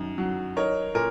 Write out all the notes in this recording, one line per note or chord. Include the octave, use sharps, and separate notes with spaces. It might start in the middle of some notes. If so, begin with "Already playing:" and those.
Already playing: F#2 D#3
F#3
D#4 A#4 C#5
A#2 A#4